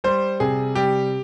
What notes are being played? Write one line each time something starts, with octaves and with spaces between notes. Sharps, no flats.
G3 C5
C3 G#4
G3 G4